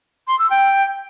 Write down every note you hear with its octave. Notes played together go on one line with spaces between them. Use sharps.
C6
E6
G5